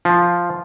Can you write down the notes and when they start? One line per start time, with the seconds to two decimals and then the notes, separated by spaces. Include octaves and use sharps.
0.05 F3